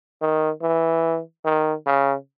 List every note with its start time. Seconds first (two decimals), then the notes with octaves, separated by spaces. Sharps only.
0.21 D#3
0.62 E3
1.45 D#3
1.86 C#3